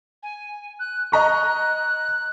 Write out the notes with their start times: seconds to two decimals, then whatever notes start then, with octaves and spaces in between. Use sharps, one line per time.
0.23 G#5
0.80 F#6
1.12 D#5 A#5 C#6 F#6